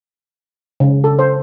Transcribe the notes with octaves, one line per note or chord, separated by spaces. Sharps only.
C#3
A4
C5